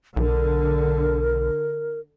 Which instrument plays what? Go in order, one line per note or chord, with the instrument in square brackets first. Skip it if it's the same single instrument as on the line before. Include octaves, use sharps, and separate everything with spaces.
[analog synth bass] B1 [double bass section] D3 [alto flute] A#4